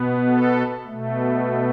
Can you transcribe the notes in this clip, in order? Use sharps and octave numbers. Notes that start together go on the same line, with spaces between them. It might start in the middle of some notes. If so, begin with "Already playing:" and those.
Already playing: B2 B3
A4
B2 A3